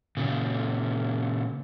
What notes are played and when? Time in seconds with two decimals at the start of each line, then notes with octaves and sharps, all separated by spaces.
0.17 A#2 C#3